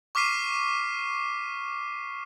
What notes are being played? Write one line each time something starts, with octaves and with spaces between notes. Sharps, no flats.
C#6 D6 F6 B6 C7 D#7